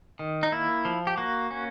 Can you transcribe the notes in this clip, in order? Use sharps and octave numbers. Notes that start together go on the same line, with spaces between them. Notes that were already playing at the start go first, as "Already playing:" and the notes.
D#3
D#4
A#3 E4
F3
G4
A#3 F#4
C#4